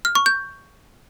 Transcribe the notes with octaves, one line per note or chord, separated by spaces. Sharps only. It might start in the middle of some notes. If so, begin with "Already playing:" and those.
F6
C#6
G6